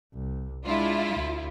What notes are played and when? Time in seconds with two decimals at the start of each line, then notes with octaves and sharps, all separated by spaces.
0.14 C2
0.65 G#3 D4 E4 F4
1.15 D2